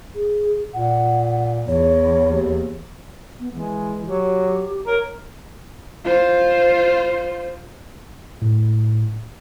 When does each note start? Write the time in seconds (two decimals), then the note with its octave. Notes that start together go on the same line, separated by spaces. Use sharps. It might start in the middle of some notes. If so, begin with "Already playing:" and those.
0.15 G#4
0.74 A#2 F#5
1.68 E2 C#5
2.23 D#2
3.40 B3
3.54 E3 G#3
4.06 F#3 G4
4.87 A#4 C#5
6.05 F4 C5
8.42 A2